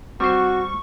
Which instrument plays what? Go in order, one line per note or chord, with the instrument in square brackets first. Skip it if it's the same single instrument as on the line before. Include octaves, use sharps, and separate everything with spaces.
[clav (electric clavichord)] G3 C5 [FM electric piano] C4 [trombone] F#4 [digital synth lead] C#6